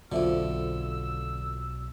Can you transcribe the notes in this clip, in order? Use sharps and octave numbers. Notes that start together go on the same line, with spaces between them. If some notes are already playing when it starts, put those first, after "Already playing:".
B1 F2 B2 D3 F4 C5 E5 E6